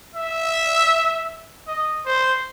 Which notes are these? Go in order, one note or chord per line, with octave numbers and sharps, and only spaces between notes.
E5
D#5
C5